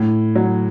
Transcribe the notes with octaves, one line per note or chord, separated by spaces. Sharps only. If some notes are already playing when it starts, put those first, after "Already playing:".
Already playing: A2
F#3